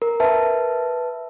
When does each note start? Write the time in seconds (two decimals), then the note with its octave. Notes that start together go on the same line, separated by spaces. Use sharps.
0.02 A#4
0.20 B4 E5 A5